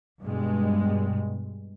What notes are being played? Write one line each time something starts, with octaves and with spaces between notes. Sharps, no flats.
G2 B2 G#3